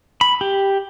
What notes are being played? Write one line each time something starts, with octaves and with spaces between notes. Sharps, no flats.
B5
G4